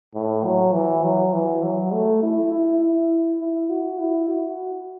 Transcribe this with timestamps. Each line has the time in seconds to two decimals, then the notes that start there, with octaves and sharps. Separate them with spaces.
0.15 A2
0.44 F#3
0.74 E3
1.04 F#3
1.33 E3
1.63 F#3
1.93 A3
2.22 E4
2.52 E4
2.81 E4
3.40 E4
3.70 F#4
3.99 E4
4.28 F#4